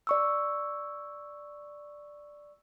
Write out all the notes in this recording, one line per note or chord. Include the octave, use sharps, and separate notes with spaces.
D5 C#6 E6